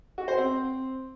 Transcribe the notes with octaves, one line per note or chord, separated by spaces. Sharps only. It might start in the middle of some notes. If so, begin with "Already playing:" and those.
F#4
C5
C4